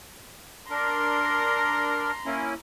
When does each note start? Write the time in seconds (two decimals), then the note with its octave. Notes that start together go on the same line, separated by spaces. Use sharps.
0.71 D4 A#4 A#5 C6
2.26 A#3 C#4 E4